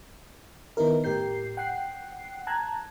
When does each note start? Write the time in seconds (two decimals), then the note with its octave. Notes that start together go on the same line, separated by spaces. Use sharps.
0.77 D#3 B3 D#4 E4 A#4
1.04 A2 G4 A#4 G6 C7
1.57 F#5 G5 F#6 C7
2.47 A5 A#5 F#6 G#6